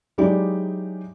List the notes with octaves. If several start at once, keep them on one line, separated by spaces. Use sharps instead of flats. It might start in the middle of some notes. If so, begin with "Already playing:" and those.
F#3 G#3 D#4 E4 G4 D5